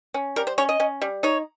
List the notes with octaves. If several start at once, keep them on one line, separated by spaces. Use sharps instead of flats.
C#4
G3 A#4
C5
C#4 C#5
D#5
C#4
G3
D#4 C#5